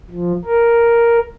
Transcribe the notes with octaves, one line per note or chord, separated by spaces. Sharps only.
F3
A#4